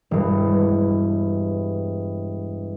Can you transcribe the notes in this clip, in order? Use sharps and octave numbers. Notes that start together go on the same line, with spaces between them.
E1 G2